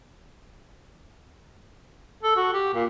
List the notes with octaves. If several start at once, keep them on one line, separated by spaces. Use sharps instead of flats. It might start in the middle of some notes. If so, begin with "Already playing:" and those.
A4
F#4
G4
A#2